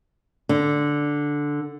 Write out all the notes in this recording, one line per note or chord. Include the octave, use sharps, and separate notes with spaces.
D3